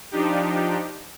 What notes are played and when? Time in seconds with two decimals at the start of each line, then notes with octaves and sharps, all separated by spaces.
0.11 F3 D4 D#4 G4